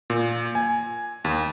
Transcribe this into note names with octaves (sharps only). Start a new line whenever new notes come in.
A#2
G#5
D#2